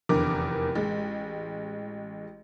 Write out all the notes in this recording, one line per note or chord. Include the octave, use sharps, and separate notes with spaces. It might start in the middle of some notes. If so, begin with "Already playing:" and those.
F1 E2 D3 A#4 D6
A1 G#3